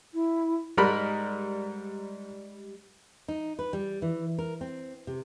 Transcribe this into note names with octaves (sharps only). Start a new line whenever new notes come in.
E4
G#2 G3 G#3 A#4 B5
D#4
B4
G3
E3
A#4
C4
C3